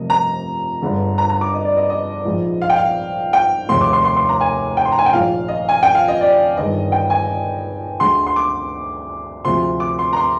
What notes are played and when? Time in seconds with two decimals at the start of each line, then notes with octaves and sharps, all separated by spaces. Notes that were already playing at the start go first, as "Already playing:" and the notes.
Already playing: F1 F2 C3 G3 A#3 D#5
0.10 A#5
0.82 G1 G2 D3 G#3
1.18 A#5
1.30 A#5
1.41 D6
1.54 D#5
1.65 D5
1.77 D#5
1.90 D#5
2.25 A#1 G#2 F3 G#3
2.62 F5
2.70 G5
2.76 F5
3.33 G5
3.69 F1 D#2 D#3 G#3 C6
3.81 D6
3.93 C6
4.04 C6
4.17 C6
4.29 A#5
4.41 G#5
4.77 G5
4.85 C6
4.92 A#5
4.99 G#5
5.06 G5
5.13 A#1 A#2 G#3 F5
5.48 D#5
5.69 G#5
5.83 G5
5.95 F5
6.08 D#5
6.21 D5
6.57 G1 G2 D#3 G#3 D#5
6.92 G5
7.10 G#5
8.00 D2 D3 G#3 C6
8.27 C6
8.36 D6
9.45 D2 C3 F3 G#3 C6
9.80 D6
9.99 C6
10.13 A#5
10.17 C6